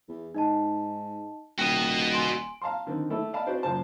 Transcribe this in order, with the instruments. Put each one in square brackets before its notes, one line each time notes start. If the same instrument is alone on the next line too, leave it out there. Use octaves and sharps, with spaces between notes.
[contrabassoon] E2
[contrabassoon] G#2 [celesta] D#4 D#5 A5
[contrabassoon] D#1 [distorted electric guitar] F#4 D#5 [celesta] G5
[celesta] G#5 C6 D7
[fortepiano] F5 A5 A#5 C6
D3 D#3 C4
A3 E4 A4
D5 D#5 F5 A5 B5
C4 F#4 G#4 B4 C5 D5
F#2 A#2 C#3 C5 A5